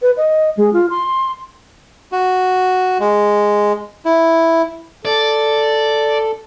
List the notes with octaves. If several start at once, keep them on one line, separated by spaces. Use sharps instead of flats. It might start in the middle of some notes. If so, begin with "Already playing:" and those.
B4
D#5
G#3
F4
C6
F#4
G#3
E4
A4 D5